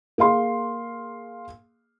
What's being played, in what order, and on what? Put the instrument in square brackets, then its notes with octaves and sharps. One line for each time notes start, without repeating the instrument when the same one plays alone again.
[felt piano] A#3 G#4 F5 C6